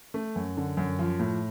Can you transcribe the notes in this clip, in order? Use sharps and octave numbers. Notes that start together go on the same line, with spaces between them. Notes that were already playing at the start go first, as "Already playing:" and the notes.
A3
F#2
D3
F#2
F3
A2